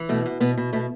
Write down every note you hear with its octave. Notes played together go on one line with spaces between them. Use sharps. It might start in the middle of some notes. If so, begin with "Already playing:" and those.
Already playing: E3
B2 A3
B2
B2 B3
B2
B2 A3